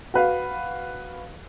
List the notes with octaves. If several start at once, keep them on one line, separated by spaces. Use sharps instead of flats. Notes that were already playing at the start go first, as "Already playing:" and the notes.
F#4 B4 F5